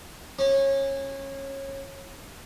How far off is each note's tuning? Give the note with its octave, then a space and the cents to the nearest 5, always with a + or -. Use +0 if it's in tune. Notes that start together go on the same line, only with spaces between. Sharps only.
C#4 -25